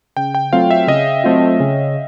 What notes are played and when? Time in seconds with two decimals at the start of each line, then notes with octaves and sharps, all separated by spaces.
0.17 C#3 G5
0.35 G5
0.52 F#3 A3 C4 F4 F5
0.71 E5
0.88 C#3 D#5
1.24 F#3 A3 C4 F4
1.60 C#3